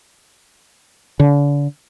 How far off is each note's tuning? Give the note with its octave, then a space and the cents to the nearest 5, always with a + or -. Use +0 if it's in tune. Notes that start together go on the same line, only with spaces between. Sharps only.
D3 -40